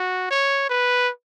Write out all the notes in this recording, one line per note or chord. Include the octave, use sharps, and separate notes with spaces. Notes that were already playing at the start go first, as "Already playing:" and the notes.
Already playing: F#4
C#5
B4